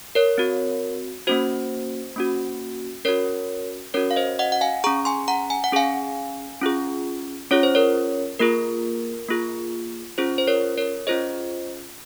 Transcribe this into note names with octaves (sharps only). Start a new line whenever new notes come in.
A#4 C#5
C4 F#4
A#3 C#4 F#4 C5
A#3 C#4 F#4
C#4 F#4 A#4 C#5
C#4 F#4 A#4 C#5
F5
C5 D#5
D#5 F#5
F#5
F5 G#5
C#4 G#4 A#5 C#6
G#5 C6
F#5 A#5
G#5
F#5
C#4 G#4 F5 G#5
C#4 F4 G#4
C#4 F4 G#4 C#5
C5
A#4 C#5
A#3 F4 G#4 A#4
A#3 F4 G#4
C#4 F4 G#4 C5
C5
A#4 C#5
A#4 C#5
C#4 F4 G#4 C5 D#5